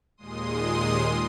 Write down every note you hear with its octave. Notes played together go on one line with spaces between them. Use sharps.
D#2 A#2 G#3 C6 D#6